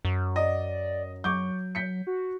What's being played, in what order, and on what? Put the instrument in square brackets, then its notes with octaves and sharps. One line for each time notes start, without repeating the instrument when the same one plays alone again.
[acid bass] F#2
[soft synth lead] D5 [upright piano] D#5
[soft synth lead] F#3 [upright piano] C#6 D6 G6
[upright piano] G6 B6 C#7
[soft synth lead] F#4